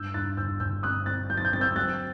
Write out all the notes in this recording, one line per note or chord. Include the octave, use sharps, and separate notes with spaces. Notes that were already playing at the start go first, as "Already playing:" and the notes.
Already playing: G2 E6 G6
G2 F#6 A6
G1 E6 G6
G1 E6 G6
C4 D#6 F#6
C4 F#6 A6
F#3 G6
A6
G6
C4 A6
E6 G6
F#3 F#6 A6